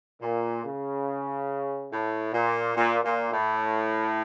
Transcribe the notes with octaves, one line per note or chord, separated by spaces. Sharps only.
A#2
C#3
A2
A#2
A#2
A#2
A2